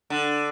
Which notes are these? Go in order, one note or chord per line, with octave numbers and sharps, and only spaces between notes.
D3